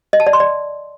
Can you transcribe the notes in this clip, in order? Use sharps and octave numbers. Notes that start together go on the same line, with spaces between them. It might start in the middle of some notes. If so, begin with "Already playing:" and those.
D#5
A5
D5
C6
D5